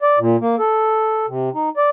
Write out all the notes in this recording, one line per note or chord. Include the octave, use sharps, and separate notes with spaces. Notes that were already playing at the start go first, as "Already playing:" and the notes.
D5
A#2
A#3
A4
C3
D#4
D5